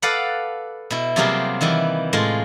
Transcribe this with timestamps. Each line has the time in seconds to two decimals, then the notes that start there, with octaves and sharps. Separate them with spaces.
0.02 A4 B4 D5 F5 F#5
0.90 B2 E4
1.16 C3 F#3 G3 A#3 F4 G#4
1.61 D#3 E3 G3 E4
2.13 A2 G#3 F4